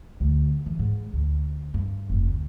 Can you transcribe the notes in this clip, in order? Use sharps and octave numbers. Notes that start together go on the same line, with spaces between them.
D2
E3
G#2
D2
G2
F1
D2